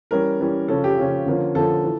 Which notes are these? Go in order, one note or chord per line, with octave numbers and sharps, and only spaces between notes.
E3 G3 C#4 A#4
E3 G3 C#4
C#3 F3 C#4 A4
G4
C#3 F3 C#4
D3 F3 A#3 C#4
D3 F3 A#3 C#4 A4
E3